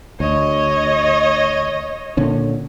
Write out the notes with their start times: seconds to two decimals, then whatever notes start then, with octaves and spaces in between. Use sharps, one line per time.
0.20 D2 C#5 D#5
2.17 A#2 D3 C#4